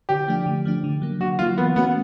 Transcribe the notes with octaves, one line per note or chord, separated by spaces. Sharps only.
D3 G4
F3 A3 D4
D3
F3 A3 D4
D3
F#3 A#3
D3 F#4
F#3 A#3 F4
E3 B3
A3 B3 C#4 F#4